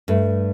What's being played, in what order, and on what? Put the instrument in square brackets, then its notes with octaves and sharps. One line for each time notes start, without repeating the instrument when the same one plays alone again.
[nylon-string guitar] G2 [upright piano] A3